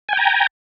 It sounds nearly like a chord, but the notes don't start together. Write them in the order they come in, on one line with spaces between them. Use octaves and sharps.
G#5 G5 A#5